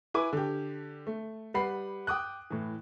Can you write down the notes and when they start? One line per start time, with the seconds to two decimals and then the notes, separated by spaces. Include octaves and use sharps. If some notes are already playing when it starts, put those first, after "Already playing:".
0.14 E4 B4 G#5 D6
0.33 D3 G4
1.07 A3
1.54 G3 B4 F#5 B5 C7
2.07 G5 D6 D#6 F#6
2.50 A2 E3